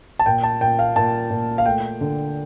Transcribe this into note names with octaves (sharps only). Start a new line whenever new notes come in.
A5
A#2 G5
A5
A#2 G5
F5
A#2 A5
A#2
F5
A3 G5
D3